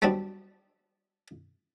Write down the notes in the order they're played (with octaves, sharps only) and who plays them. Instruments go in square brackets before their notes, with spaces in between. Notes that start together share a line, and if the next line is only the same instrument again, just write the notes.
[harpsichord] F#3 G3 B3 C4 D4